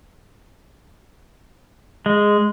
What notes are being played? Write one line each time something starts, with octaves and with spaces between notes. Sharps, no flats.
G#3